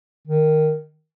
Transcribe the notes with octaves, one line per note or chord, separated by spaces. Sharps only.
D#3